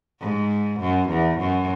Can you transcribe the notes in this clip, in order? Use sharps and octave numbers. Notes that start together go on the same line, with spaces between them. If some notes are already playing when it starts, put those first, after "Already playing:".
G#2
F#2
E2
F#2